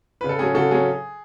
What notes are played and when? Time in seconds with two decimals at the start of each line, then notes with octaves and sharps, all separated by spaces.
0.21 C#3 B4
0.29 A4
0.39 F#3 C#4 G#4
0.55 C#3 F#4 A4
0.71 F#3 C#4 G#4